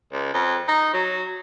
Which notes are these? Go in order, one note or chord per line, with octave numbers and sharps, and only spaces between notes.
C#2
F2
D#4
F#3